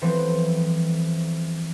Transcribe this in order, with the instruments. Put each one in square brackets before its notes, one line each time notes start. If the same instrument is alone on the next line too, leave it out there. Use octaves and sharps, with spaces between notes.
[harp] E3 F3 G3 A3 B3 C4